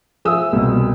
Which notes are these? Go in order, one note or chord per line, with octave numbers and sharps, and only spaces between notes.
F3 G#4 E5 D#6 E6
C2 B2